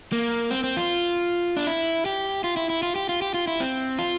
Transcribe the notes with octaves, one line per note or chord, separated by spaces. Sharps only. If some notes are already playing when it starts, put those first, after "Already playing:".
A#3
C4
C4
F4
D4
E4
G4
F4
E4
E4
F4
G4
F4
G4
F4
E4
C4
F4